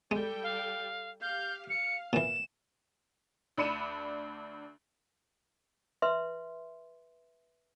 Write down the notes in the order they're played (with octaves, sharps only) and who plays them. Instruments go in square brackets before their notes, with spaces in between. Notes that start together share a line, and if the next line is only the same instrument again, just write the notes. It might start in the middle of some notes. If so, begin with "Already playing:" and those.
[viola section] G3 A4 G5 [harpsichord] G#3
[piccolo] F5
[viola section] G4 F5 [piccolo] G6
[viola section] F5 [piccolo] C#7
[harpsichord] A#2 E3 [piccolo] E7
[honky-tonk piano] D2 D4 B5 C#7 D#7 E7
[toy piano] B4 E5 C6